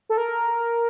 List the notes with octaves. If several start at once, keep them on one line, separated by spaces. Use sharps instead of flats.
A4
A#4